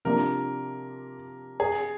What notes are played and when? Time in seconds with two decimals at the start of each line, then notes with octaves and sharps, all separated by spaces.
0.05 C3 F3 A#3 D4 A#4
1.60 G#4